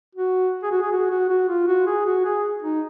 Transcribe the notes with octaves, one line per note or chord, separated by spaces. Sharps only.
F#4
G#4
F#4
G#4
F#4
F#4
F#4
F4
F#4
G#4
F#4
G#4
D#4